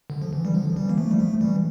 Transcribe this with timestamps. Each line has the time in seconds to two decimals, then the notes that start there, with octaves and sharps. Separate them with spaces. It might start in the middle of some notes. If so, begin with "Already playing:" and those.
0.10 D3
0.22 F3
0.33 E3
0.45 G3
0.54 D3 F3
0.69 F3
0.76 E3 G3
0.89 A#3
0.97 F3 A3
1.11 G3
1.19 F3 A3
1.41 E3 G3